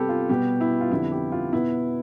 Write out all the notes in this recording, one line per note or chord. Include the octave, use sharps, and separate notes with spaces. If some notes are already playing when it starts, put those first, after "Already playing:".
Already playing: C3 G3 B3 G4 A4 B4
F4
B2 G3 B3 G4
E4
F4
F2 D3 G3 B3 E4
G4
F4
B2 B3 E4